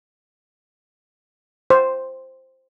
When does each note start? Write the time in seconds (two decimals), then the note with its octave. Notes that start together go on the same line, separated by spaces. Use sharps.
1.70 C5